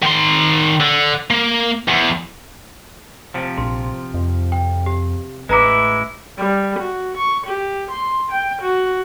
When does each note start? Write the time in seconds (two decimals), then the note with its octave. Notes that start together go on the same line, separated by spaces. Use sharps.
0.03 D#3 C6
0.81 D3
1.30 A#3
1.88 E2
3.34 C3 F3
3.58 A#1 C6
4.14 F2
4.52 G5
4.86 G4
5.49 A1 G#3 E4 B4 A#5 D6
6.38 G3
6.79 F#4
7.17 C#6
7.47 G4
7.91 C6
8.31 G5
8.62 F#4